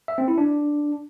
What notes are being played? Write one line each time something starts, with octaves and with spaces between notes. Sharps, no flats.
E5
C4
E4
D4